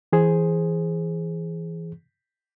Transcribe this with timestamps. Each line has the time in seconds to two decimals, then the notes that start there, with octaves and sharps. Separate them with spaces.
0.13 E3 G#4 C5